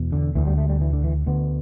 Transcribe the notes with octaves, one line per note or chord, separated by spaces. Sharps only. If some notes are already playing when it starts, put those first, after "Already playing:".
Already playing: E2 B2
D3
D2 D3 E3
G3
A3
G3
E3
D3
E3
D2 D3 B3